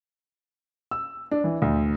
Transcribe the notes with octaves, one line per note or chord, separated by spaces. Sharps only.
E6
D4
E3
D2